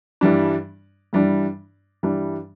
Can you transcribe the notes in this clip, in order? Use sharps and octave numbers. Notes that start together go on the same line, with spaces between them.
G2 E3 G3 D4
G2 E3 G3 D4
G2 E3 G3 D4